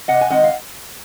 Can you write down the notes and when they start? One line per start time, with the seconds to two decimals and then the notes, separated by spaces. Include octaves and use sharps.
0.08 C3 D#5 F#5
0.21 G#5
0.30 D#3 G#3 C4 D#5 F#5
0.44 F5